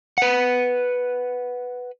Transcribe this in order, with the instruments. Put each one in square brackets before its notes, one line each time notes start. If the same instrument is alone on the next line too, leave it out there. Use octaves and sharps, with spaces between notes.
[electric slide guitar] B4 F#5